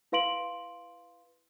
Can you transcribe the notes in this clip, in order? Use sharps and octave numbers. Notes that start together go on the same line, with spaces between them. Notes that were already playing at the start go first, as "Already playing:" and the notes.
E4 B4 F5 C6 D7 F#7